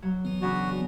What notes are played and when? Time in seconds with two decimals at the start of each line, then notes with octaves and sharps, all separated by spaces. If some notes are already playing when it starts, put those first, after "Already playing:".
0.02 F#3
0.25 E3 B3
0.42 C#3 D4 F#4